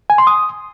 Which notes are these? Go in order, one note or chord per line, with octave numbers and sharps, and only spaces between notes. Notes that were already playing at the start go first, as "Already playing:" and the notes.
G#5
C6
D#6